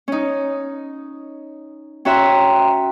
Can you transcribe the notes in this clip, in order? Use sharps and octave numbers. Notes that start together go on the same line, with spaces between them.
C#4 D#4
C#4 F#4 E5 G5 A#5 C6